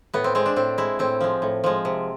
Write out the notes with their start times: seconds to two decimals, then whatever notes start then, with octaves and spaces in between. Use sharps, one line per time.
0.14 A2 B3
0.24 C4
0.35 G#3 C4
0.46 D4
0.56 A2 C4
0.78 G#3 E4
0.99 A2 C4
1.21 F3 G#3
1.42 A2
1.64 F3 G#3
1.85 C3